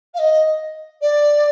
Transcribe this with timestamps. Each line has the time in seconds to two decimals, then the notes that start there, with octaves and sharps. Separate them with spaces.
0.14 F5
0.18 D#5
1.01 D5